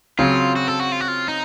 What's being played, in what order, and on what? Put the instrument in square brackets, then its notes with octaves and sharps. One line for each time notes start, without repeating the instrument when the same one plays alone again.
[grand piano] C#3 F#3 C4 [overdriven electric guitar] F4
[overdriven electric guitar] F#4
A4
F#4
F4
F#4
F4
D#4